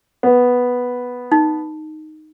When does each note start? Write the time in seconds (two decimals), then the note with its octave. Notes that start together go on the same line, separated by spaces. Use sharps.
0.23 B3
1.32 D#4